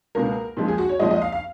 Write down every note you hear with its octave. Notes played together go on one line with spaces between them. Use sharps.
C#2 B2 A#3 A#4
A#2 F3 G#3
G#4
F#4
C#5
A#2 F3 G#3 D#5
D#5
F5
F5